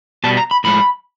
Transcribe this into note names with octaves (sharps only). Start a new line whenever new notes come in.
B2 G3 A5
A#5
B5
A2 F3 G#3 B5